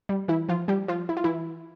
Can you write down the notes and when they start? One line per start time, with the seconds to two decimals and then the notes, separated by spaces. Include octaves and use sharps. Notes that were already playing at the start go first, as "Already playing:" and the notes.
0.09 G3
0.28 E3 E4
0.49 F3 F4
0.68 G3 G4
0.88 F3 F4
1.09 E4
1.17 F4
1.24 E3 E4